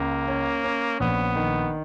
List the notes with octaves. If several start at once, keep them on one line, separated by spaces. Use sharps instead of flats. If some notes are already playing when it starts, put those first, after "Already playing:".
Already playing: C#2 A#3
C#4
C#4
A#1 B3
D#3